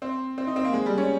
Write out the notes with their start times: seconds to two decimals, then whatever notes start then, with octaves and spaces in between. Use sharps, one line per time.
0.02 C4
0.38 C4
0.47 D#4
0.56 C4
0.64 A#3
0.73 G#3
0.86 G3
0.98 C#4